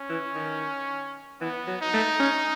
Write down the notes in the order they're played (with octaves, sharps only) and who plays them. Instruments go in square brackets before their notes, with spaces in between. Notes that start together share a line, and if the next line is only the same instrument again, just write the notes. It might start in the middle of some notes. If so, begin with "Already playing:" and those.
Already playing: [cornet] C#4
[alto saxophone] E3
D#3
[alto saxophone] E3 [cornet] B3
[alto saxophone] F#3
[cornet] D#4
[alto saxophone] A3
C#4